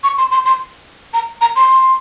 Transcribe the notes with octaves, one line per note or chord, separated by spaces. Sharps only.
C#6
C6
C6
C6
A#5
A#5
C6